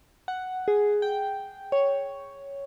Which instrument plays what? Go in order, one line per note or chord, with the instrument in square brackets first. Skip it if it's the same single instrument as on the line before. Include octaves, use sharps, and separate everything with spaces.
[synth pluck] F#5
G#4
G5
C#5